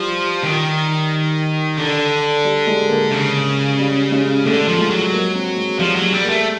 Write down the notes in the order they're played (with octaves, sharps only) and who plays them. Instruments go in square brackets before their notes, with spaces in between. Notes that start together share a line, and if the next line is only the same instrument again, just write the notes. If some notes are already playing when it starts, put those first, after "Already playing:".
Already playing: [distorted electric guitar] F3 [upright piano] G3
[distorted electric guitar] D#3
D3
[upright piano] G3
G#3
A#3
[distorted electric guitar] C#3
[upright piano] G3
G#3
[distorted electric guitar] D3 [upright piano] A3
[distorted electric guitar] F3
[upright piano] G#3
[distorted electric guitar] F#3
[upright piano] A#3
C4
G#3
[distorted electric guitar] F3 [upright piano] G3
[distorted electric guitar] F#3
[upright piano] G#3
[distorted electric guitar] G3
[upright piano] A#3
[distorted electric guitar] A3